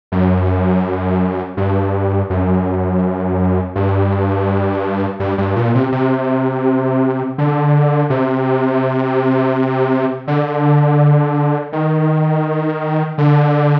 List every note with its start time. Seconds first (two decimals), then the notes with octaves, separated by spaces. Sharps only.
0.12 F#2
1.57 G2
2.30 F#2
3.75 G2
5.20 G2
5.38 G2
5.56 A#2
5.75 C3
5.92 C3
7.38 D3
8.10 C3
10.28 D3
11.72 D#3
13.18 D3